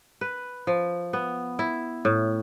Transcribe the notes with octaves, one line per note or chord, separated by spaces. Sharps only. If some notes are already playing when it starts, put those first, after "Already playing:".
B4
F3
B3
E4
A2